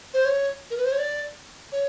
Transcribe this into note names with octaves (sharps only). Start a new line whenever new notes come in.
C5
C#5
A#4
B4
C5
C#5
D5
C#5